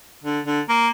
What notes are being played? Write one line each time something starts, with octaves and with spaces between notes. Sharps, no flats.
D3
D3
A#3